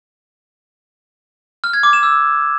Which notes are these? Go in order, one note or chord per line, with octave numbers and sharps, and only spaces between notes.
F6
G#6
D6
E7
E6